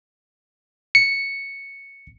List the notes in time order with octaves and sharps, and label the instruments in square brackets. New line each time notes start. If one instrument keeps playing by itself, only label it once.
[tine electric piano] C#7